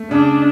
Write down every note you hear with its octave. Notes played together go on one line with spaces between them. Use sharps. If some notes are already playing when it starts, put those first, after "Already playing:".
Already playing: A3
C#3 D4